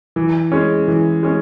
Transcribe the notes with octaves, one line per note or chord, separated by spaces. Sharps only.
E3
G#3 C#4
E3
G#3 C#4